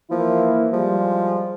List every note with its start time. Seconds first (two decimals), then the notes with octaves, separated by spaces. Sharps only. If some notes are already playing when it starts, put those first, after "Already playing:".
0.11 E3 F3 A#3 E4
0.73 F3 G3 G#3